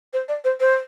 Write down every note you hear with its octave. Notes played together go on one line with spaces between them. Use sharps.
C5
D5
C5
C5